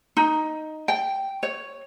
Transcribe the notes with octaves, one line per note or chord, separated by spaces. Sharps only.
D#4
G5
C#5